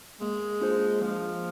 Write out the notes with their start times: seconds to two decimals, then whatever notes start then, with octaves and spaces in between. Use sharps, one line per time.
0.20 G#3 A#3
0.61 D4 F4 G#4 C5
1.01 F3 A#3